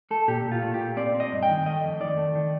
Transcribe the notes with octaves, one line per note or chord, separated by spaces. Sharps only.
A3 A4
A#2 G4
A#2
F4
A3
G4
A#2
C4 D5
C4
D#5
G2
G5
D#3
A3 D#5
F2
D#3 D5
A3
D#3